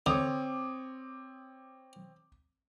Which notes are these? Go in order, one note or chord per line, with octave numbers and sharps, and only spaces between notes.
D3 C4 C#5 D6 D#6